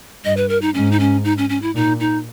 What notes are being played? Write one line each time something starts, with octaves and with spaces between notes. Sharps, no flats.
G2 D#5
B4
A#4
D#4
G#2 C#4
D#4
C#4
D#4
C#4
C#4
E4
A#2 D#4
D#4